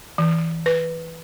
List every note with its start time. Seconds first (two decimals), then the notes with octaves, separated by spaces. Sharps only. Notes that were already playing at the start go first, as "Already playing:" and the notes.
0.18 E3
0.66 B4